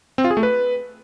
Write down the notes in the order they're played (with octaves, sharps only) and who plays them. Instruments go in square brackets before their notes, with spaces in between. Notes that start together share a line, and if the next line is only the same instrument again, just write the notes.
[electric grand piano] C4
F4
G#4
A3
B4